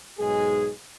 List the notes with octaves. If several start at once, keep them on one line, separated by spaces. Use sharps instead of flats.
B1 G#2 G#3 G#4